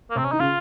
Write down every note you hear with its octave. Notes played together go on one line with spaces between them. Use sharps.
A#3
C3
C4
C#4
D#3 D#4
C#3 F4